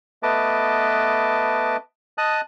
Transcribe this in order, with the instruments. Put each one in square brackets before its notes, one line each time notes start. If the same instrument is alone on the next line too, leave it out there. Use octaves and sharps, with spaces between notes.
[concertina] A3 B3 B4 D#5 A5 D6
D#5 A5 D#6 F#6